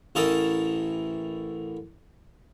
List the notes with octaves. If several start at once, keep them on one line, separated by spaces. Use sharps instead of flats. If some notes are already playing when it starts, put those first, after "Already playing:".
A1 E3 A4 A#4 A5 D#6